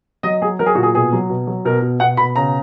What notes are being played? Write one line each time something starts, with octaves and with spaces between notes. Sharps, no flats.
F#3 D#5
F#3 G#4
F#3 A#4
G#4
A#2 F#4
G#4
B2 G#4
F#3
B2
F#3
B2 A#4
B2
B2 F#5
B2 B5
C#3 A#5